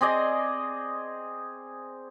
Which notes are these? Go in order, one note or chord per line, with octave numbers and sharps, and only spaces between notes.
C4 G#4 D5 D#5